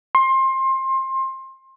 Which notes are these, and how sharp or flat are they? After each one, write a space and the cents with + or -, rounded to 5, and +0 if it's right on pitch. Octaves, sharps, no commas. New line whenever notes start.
C6 +25